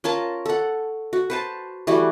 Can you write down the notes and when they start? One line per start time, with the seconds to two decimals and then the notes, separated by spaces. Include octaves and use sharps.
0.04 C#4 F4 A#4 A5
0.46 A4 F#5
1.13 F#4
1.30 B4 C5 A5
1.87 E3 G3 A3 F#4